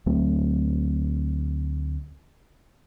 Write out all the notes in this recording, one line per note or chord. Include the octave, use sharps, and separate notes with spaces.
D2 F#3 A3 C4